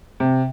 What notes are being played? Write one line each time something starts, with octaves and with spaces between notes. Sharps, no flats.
C3